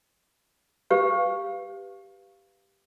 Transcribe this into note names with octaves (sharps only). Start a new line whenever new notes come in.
G4 B4 F5